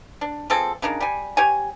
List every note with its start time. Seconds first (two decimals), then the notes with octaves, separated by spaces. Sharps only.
0.21 D4
0.50 F3 C4 G#4 A4
0.82 C#3 D4 D#4 A#4
1.00 G3 G#5
1.37 G4 C#5 G#5